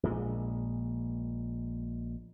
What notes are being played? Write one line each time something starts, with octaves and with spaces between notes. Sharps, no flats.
A#1 A#2 G#3